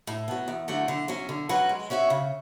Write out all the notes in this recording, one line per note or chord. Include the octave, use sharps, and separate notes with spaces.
A2
F#3 B3
E2
D3 F#3 A3
D3
F#3 C#4
D3
F#3 C#4 F#4 B4
G#3
C#4 F#4 C#5 E5
C#3